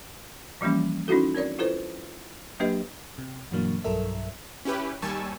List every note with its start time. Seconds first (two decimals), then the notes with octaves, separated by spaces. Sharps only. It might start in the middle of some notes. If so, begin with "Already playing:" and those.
0.61 E3 F3 G3 A#3 C#4
1.08 C#4 D#4 E4 F#4 A4
1.35 C4 A#4 C#5 D5
1.59 E4 F4 A4 B4 C5
2.60 F#3 A#3 D4 G4 B4 D#5
3.18 C3
3.51 G2 B2 E3 F#3 A#3 D4
3.84 B1 G2 F#3 A4 A#4 E5
4.65 C#4 E4 G4 B4
5.02 D#2 G3 G#5 A5 C#6 E6